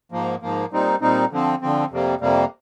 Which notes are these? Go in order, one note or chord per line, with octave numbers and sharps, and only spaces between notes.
G#2 F3 A#3
G#2 F3 A#3
A#2 G3 C4 D#4
A#2 G3 C4 D#4
D3 F3 C4
D3 F3 C4
F2 C3 G3 A#3
F2 C3 G3 A#3